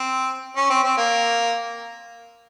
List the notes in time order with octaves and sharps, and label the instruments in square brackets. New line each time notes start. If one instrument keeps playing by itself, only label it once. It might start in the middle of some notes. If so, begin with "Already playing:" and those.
Already playing: [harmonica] C4
C#4
C4
C4
A#3